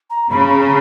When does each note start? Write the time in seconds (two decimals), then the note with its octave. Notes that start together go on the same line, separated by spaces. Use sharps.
0.10 A#5
0.30 C#3 B5
0.50 A#5